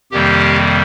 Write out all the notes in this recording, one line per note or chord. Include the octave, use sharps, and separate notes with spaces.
F2 C3 D#3 G3 A#3 G4